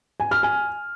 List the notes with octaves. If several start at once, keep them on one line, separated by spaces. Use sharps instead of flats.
G#5
F6
G#5